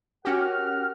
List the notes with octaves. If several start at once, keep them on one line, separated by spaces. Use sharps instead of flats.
C#4 F#4 G4 A#4 F#5 F6